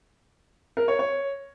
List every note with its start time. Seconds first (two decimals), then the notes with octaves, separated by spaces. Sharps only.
0.77 A#4
0.88 C#5
0.99 C#5